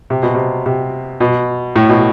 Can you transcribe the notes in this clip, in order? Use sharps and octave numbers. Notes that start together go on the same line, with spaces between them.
C3
B2
C3
C3
B2
A2
B2